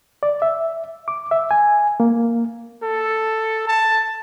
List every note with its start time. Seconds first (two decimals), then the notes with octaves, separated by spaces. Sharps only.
0.23 D5
0.42 E5
1.08 D6
1.31 E5
1.51 G#5
2.00 A#3
2.82 A4
3.68 A5